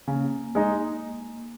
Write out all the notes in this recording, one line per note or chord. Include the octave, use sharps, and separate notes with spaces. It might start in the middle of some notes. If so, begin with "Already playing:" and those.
C#3 A#3
G#3 D#4